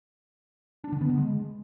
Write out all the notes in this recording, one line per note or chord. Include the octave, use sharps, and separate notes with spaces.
D4
D3
B3
D3
G#3